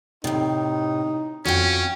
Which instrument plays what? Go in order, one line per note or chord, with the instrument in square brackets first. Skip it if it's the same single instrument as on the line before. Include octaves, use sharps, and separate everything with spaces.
[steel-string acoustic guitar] A2 C3 [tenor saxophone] D#4
[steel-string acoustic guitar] F2 G5 [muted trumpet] C#4 [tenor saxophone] F#4